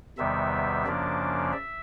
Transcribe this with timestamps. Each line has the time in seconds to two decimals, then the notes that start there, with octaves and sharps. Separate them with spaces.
0.17 E2 C3 D#3 G3 B3 E5
0.85 F#2 C#3 F3 A#3 D4 D5
1.53 E5